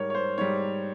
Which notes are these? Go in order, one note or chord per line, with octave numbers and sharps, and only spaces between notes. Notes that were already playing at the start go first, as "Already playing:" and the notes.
Already playing: G#2 G3 A#4 C#5
C#5
C5
G#2 G3 C#5